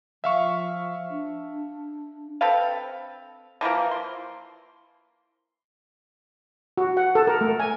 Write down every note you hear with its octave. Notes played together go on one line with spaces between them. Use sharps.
F3 E5 F5 C#6
D4
C4 A4 B4 F5
D3 E3 F3 A#3
C6
F#4
F#5
A4
A#4
A3
G#5